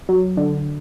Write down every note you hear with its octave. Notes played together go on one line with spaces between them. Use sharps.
F#3
D3